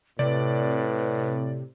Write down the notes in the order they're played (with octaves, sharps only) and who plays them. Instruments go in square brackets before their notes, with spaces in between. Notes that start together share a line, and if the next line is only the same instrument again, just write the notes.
[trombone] A2 [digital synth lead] C3 [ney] B4 [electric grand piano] D5